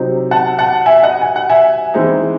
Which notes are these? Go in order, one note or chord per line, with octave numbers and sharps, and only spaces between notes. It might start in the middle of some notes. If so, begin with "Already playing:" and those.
Already playing: C3 F#3 C4 D#4
F#5 A5
F#5 A5
E5 G#5
D#5 F#5
G#5
F#5
E5 G#5
E3 G#3 C4 D#4